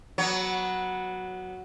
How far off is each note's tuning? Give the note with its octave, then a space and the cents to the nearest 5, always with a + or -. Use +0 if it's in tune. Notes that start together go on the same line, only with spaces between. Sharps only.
F#3 +0 B3 -20 C#5 +15